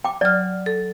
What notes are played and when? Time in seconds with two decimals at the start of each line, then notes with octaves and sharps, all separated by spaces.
0.05 G5 D6
0.21 F#3 D5 F6
0.66 A4